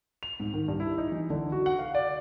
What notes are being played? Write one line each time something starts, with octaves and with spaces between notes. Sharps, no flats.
F7
G#2
D#3
G2
E4
D#4
E3
D3
F#4
F#5
F5
D5